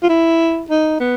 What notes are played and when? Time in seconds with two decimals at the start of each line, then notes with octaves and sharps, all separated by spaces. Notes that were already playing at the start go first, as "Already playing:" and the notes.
0.03 F4
0.09 E4
0.70 D#4
1.00 B3